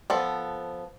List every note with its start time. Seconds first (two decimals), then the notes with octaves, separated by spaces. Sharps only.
0.10 F3 B3 A4